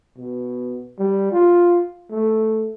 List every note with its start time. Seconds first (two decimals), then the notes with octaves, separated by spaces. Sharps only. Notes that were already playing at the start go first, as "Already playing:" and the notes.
0.18 B2
0.99 G3
1.32 F4
2.11 A3